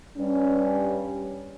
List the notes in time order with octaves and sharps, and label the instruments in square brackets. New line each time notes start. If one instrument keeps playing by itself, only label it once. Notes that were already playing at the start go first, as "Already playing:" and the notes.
[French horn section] G2 G3 C#4